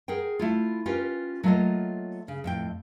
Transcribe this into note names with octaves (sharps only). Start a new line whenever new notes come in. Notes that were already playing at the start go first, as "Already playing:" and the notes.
G#4 A#4 F#5 G5
A3 E4 F4
C#4 F4 G4 A#4 B4
F#3 A3 A#3 F4 C#5 D#5
C#3
F2 A2 G5